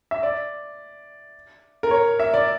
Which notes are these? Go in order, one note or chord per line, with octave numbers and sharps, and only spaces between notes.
E5
D5
A#4
C#5
E5
D5